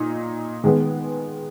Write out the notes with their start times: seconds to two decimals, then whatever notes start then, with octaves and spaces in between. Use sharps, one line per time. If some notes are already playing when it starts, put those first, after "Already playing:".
Already playing: A#2 D#4
0.64 D#3 G#3 B3